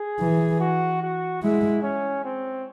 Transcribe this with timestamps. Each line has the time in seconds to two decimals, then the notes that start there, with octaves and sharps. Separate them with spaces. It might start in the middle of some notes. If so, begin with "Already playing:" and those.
Already playing: G#4
0.20 E3
0.60 F#4
1.02 F#4
1.43 G#3 E4
1.83 C#4
2.24 C4